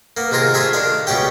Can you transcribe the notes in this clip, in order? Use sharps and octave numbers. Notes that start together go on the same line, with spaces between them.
A#3 B3
C3 D#3 F4 G#4 A#4
A3 F4 G#4 E5 G#5
D#3 D4 F5
C#2 B2 B3 C#4 G4 G5